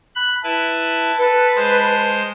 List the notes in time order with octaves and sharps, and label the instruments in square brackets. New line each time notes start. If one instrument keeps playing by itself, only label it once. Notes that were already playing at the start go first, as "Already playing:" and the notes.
[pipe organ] B5 F#6
[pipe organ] E4 B4 [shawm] A5
[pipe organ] A4 [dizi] B4
[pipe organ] G#3 C5